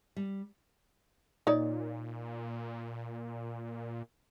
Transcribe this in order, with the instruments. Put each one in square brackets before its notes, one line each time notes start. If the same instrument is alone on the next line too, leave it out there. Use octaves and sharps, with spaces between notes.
[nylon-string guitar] G3
[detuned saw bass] A#2 [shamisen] D#4 C#5 D5